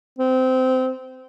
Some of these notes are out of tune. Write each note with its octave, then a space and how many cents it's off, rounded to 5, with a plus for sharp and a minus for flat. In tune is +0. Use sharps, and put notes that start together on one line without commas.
C4 -20